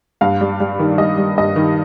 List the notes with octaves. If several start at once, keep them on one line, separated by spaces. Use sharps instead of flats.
G2 F5
G3
G3
D#3
G3 D#5
G3
G2 D#5
D#3